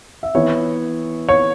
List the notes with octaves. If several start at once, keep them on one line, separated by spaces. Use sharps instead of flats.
E5
E3 B3 E4 C#5
C#5